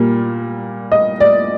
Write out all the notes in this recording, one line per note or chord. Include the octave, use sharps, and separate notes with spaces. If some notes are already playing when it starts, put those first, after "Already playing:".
Already playing: A#2 G3 A#3
D#5
D5